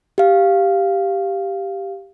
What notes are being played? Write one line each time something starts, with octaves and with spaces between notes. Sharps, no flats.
G4 F5